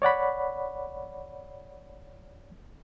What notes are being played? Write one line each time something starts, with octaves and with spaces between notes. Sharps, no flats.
C#5 D5 F#5 B5